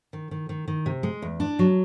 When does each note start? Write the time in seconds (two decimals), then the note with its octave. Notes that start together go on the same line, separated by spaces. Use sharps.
0.13 D#3
0.31 D#3
0.49 D#3
0.68 D#3
0.86 C3
1.03 G#3
1.22 E2
1.40 D4
1.59 F#3